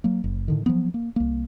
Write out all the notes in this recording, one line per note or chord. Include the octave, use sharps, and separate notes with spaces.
F#3 A#3
F#1
A2 D3 D#3
F3 F#3 G#3 B3
A#3
C2 A#3